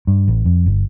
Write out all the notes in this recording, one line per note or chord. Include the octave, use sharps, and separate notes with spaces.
G2
A1
F2
G1